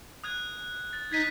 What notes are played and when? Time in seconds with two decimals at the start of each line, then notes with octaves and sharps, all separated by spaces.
0.24 D#6 F#6 G#6
0.93 A6
1.12 D#4 G#6 B6 D#7